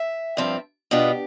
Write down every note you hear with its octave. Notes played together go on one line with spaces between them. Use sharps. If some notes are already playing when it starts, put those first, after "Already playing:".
Already playing: E5
G2 F3 C4
B2 B3 D4 F4 G4